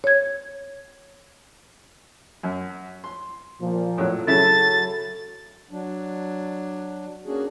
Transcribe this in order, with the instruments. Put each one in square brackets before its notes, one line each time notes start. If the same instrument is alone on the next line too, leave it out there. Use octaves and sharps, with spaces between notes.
[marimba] C#5 G#6
[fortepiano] F#2
C6
[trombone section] A#2 F3
[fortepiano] A2 F#3
[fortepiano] C#3 E4 [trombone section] F#3 A4 [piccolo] A6
[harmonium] F#3 D4
A#3 C#4 D4 F#4 G#4